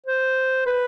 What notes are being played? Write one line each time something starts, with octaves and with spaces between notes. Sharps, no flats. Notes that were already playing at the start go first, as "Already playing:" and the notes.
C5
B4